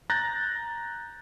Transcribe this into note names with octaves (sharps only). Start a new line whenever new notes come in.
A#5 F#6 G6 A6 A#6